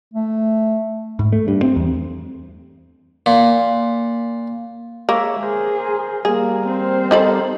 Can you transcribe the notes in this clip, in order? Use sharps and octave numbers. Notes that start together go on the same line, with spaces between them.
A3
G#2
A3
G2
C4
E2
A#2
G#3 A#3 C#5 E5
G#4 A#4 C5
G3 A#3 G#4 A#4
C4 C5
D#4 A4 B5